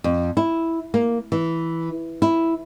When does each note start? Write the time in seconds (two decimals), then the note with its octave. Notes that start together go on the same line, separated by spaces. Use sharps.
0.04 F2
0.37 E4
0.94 A#3
1.32 E3
2.22 E4